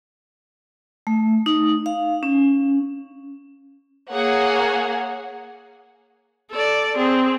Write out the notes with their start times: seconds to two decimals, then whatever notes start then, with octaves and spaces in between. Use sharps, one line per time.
1.07 A3
1.46 D#4
1.86 F5
2.23 C#4
4.12 A#3 G#4 C#5 F#5
6.51 A4 D5
6.97 C4 G#4